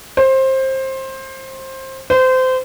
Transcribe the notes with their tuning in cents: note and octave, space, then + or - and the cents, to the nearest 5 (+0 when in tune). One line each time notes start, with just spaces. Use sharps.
C5 +20
C5 -25